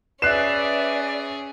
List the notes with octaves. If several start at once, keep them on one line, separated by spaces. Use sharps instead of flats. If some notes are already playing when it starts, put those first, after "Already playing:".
C#4 G#4 B4 D5 E5 F#6 C7 E7